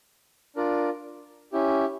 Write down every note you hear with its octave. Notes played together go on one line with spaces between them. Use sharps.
D4 F4 A#4 D5
C#4 E4 G4